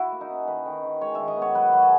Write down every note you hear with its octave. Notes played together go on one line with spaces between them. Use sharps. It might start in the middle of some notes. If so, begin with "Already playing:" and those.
Already playing: E4 F#4
A#3
D#4
C#4
D#3 B4
D#3
D#3
G#3 C#5
D#3 E5
D#5
B3 C#5
F#3 B4
F#3
G#4